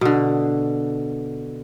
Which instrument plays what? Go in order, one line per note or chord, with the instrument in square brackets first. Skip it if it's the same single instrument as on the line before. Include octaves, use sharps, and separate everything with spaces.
[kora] B2 D3